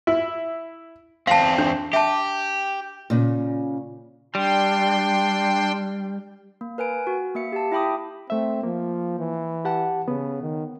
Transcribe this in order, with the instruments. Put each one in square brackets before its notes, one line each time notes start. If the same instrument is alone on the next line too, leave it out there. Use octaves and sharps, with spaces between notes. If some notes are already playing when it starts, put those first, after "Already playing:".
[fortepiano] E4
[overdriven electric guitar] E2 C4 [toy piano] F5 A5
[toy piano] D4
[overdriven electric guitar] G4 [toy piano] E5 A5
[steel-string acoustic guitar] A#2 C#3
[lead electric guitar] G3 [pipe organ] D4 G5 C6
[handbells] A#3
A#4 B4 G#5 D7
F#4
A#3 E5 C#7
G4 A5
E4 E5 G5 B5 D6 D#6
[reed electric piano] A3 E5 [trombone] C4
[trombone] F3 [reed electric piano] A#3
[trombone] E3
[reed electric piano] G4 F#5 A5
[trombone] C#3 [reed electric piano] B3
[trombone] D#3